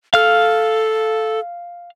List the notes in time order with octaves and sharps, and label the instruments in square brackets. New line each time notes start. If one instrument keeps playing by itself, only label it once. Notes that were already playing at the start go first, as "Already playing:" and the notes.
[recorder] A4 [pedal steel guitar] F5 F6